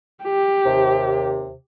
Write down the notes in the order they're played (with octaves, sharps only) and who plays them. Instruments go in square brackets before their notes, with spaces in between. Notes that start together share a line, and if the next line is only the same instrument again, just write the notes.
[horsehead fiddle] G4
[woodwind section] D#2 C3